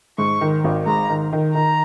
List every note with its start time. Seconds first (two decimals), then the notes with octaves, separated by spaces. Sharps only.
0.18 G#2 C#6
0.41 D#3
0.64 G#1
0.87 G#2 A#5
1.09 D#3
1.33 D#3
1.54 D#3 A#5